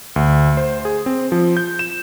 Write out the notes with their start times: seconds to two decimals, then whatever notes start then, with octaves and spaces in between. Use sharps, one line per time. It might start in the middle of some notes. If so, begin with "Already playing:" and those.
0.16 D2
0.57 C5
0.85 G#4
1.06 C4
1.32 F3
1.57 G6
1.79 E7